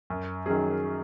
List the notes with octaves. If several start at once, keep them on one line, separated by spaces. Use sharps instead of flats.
F#2
D#3 F#3 C#4 G#4